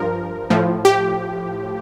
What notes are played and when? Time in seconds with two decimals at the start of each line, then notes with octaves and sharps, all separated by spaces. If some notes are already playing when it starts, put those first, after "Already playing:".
Already playing: G2 F3 A#4
0.50 A2 F3
0.85 G4